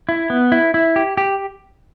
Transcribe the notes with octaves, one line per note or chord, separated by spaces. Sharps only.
E4
B3
E4
E4
G4
G4